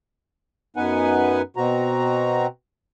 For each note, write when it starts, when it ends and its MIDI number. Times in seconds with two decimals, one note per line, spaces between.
0.76 1.42 42
0.76 1.42 59
0.76 1.42 63
0.76 1.42 71
0.76 1.42 78
0.76 1.42 80
1.56 2.47 47
1.56 2.47 60
1.56 2.47 66
1.56 2.47 82